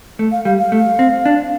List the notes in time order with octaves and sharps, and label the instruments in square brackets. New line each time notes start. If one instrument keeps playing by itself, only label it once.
[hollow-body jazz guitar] A3
[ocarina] F5
[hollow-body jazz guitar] G3 [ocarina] F5
[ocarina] F5
[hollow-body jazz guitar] A3
C4
D4